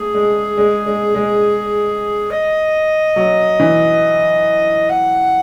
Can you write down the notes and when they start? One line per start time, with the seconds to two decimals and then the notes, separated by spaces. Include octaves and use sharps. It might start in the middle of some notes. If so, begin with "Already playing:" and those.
Already playing: A3 G#4
0.14 G#3
0.57 G#3
0.86 G#3
1.15 G#3
2.31 D#5
3.16 F#3
3.60 E3
4.89 F#5